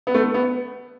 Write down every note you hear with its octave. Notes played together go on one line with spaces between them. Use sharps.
B3
A3
B3